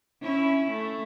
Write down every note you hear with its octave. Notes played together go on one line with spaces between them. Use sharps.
C#4 E4
A3